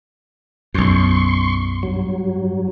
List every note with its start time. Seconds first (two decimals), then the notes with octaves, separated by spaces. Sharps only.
0.74 B1 F#2 C6 C#6
1.83 G2 F#3